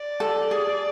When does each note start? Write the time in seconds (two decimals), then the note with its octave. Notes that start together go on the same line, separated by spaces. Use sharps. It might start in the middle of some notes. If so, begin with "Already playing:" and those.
Already playing: D5
0.20 A4
0.51 G#4